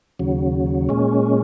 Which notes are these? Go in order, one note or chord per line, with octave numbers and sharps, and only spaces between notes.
D#2 C#3 F#3
A#2 G#3 C#4